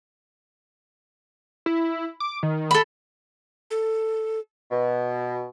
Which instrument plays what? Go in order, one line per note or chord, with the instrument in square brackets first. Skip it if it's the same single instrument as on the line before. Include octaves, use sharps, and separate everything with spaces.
[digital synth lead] E4
D6
D#3
[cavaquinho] A4 B5
[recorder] A4
[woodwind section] B2